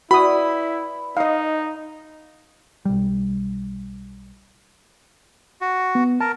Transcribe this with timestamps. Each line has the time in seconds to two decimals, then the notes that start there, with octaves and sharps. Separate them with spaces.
0.11 E4 F#4 B4 D5 B5 D#6
1.17 D#4 D#5 F5
2.85 B1 G3
5.61 F#4
5.95 B3
6.21 A#4 A5